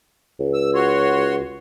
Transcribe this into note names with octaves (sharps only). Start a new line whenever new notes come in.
C#2
E6
F#4 C#5 C6